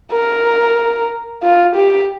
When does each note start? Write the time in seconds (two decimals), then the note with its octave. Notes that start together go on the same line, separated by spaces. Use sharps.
0.12 A#4
1.43 F4
1.76 G4